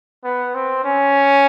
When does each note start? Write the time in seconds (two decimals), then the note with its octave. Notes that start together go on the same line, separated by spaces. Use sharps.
0.24 B3
0.54 C4
0.84 C#4